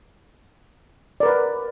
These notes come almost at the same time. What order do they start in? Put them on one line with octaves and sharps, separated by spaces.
D5 A#4 B4